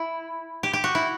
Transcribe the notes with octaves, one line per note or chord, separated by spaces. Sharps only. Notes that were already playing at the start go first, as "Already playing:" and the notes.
Already playing: E4
G4
G4
F#4
E4